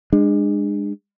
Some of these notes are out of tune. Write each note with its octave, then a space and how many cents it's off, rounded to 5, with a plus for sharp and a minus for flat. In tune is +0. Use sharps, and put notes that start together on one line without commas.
G#3 -20 D4 +25